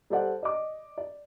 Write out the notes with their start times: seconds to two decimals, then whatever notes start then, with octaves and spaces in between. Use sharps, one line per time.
0.10 G3 A4 C5 D5 F#5
0.43 D5 D#5 D6
0.98 D5